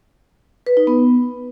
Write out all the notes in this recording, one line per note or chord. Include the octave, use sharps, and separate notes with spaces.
B4
D#4
B3